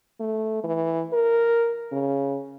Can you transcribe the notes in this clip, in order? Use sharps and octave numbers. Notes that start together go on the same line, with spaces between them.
A3
E3
A#4
C#3